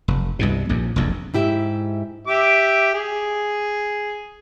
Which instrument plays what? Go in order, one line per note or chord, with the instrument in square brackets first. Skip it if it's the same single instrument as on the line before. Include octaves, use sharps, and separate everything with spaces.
[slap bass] F1
C2 G2 B2
A#1 D#2
F1 A#1 F2
[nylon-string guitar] G#2 E4 G4 E5
[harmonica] G4 E5 D6
G#4